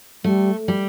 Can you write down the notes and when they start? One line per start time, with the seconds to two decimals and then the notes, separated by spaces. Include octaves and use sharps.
0.24 G3 A3
0.68 G3